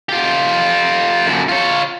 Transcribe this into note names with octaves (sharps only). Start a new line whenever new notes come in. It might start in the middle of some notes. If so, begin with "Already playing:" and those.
F4 G4
F#2 D3
F4 C#5